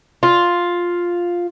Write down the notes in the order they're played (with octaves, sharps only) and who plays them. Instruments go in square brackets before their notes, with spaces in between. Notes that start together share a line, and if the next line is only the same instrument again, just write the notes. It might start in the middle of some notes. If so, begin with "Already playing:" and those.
[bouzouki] F4